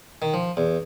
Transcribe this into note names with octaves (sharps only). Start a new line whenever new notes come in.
D#3
F3
E2